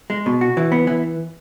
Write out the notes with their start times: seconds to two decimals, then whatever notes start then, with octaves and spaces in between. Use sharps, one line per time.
0.10 G#3
0.26 B2
0.41 F#4
0.57 E3
0.72 B3
0.87 E3